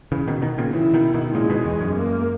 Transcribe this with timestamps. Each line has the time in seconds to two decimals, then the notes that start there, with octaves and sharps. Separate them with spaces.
0.12 C#3 E3
0.28 B2 D#3
0.42 B2 D#3
0.58 A#2 C#3
0.73 C#3 E3 E4
0.93 B2 D#3
1.14 B2 D#3
1.35 A#2 C#3 G#3
1.50 G#2 B2
1.65 E2
1.81 F#2
1.96 A#3